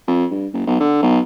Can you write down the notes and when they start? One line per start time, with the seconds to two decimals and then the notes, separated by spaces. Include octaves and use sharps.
0.08 F2
0.31 G2
0.54 F#1
0.67 B1
0.80 D3
1.02 B1